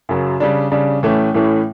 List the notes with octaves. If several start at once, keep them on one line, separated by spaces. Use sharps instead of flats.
F#2 C#3 F#3
C#3 G3 D4
C#3 G3 D4
A2 E3 A3 C#4
A2 E3 A3 C#4